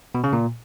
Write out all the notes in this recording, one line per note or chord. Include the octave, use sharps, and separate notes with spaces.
B2
C#3
A#2